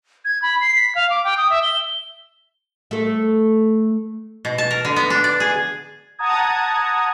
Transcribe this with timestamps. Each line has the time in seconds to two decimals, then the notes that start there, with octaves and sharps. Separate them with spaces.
0.25 G#6
0.42 B5
0.61 C7
0.76 B6
0.95 F5
1.10 D6
1.24 G5
1.37 D#6
1.50 E5
1.63 G7
2.91 A3 A4
4.45 B2
4.58 A5
4.71 A#4
4.85 D3
4.96 B3
5.10 D4
5.24 D5
5.40 G#4
6.19 F#5 A5 A#5 D#6 G#6